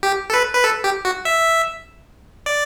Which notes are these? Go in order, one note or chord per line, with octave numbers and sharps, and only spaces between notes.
G4
A4
B4
B4
A4
G4
F#4
E5
D5